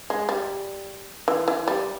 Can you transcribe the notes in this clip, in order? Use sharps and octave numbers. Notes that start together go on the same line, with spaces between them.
G#3
G3
E3
E3
G3